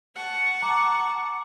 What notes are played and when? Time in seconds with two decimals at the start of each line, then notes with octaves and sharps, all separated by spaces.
0.14 F#5 A5 C#6
0.62 A#5 D6